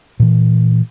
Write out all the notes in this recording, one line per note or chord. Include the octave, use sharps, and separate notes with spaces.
A#2 E3